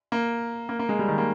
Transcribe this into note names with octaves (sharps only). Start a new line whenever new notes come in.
A#3
A#3
A#3
G#3
G3
D#3
A#3